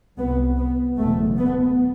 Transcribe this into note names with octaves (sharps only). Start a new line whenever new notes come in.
C2 C3 B3
B3
F#1 E2 B2 A3
B3